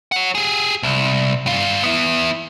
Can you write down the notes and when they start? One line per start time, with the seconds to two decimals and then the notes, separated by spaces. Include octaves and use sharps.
0.12 C#5 F#5
0.35 G4 G#4
0.83 C2
1.46 G2 F4
1.83 B3 E4